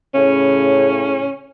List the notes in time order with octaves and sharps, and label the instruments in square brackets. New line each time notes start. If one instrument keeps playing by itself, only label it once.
[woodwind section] A2 C#3 [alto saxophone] C#4